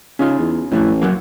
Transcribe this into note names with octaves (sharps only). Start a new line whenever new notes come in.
C#3 C#4 D#4 F4
E2
A1 F2 A2 E3
F#2 F#3 A#3